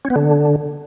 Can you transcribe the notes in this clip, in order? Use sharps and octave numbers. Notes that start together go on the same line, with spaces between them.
C#4
B3
D3